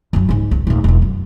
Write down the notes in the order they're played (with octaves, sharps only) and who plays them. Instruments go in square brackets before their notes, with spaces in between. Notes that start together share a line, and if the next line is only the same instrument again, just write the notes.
[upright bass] F#2 F#3
C#2 G#2
C#2
D#1 A3
E1 G#3
F#2